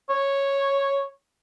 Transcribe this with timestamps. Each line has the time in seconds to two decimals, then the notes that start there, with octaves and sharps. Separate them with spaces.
0.10 C#5